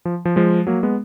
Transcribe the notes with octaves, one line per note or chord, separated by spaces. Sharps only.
F3
F3
F3 G#3
F#3 A#3
G#3 B3